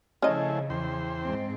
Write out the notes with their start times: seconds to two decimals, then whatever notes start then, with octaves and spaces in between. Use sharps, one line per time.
0.22 C#3 F3 A3 C#4 E4 G#4 D#5
0.70 E2 C5 G5
1.21 G#2 C4